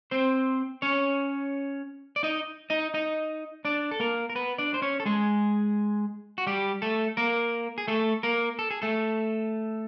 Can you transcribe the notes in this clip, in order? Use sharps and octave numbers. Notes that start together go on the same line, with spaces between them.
C4 C5
C#4 C#5
D5
D#4 D#5
D#4 D#5
D#4 D#5
D4 D5
A4
A#3 A#4
A#4
B3 B4
D4 D5
C5
C#4 C#5
A4
G#3 G#4
F#4
G3 G4
A3 A4
A#3 A#4
G#4
A3 A4
A#3 A#4
A4
G#4
A3 A4